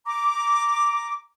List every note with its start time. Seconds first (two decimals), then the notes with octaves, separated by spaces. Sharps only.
0.06 A#5 D6